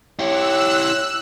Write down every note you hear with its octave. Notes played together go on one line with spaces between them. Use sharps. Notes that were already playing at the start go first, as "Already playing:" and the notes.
E4 G4 C#5 E6 F#6